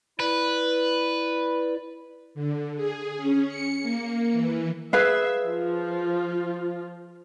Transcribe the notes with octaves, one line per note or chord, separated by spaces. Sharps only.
E4 B4 D5
D3
G#4
C#4
C#7
A#3
E3
G#4 B4 E5 F5
F3 F4